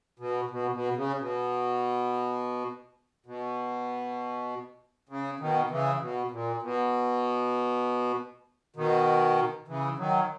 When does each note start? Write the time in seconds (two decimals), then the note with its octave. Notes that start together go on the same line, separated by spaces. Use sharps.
0.19 B2
0.51 B2
0.73 B2
0.96 C#3
1.19 B2
3.26 B2
5.09 C#3
5.40 B2 D#3
5.70 C#3 E3
6.01 B2
6.31 A#2
6.62 B2
8.76 B2 D#3
9.68 C#3 E3
9.98 D#3 F#3